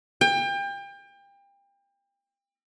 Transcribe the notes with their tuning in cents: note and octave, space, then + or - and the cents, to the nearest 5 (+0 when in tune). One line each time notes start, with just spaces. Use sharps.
G5 +30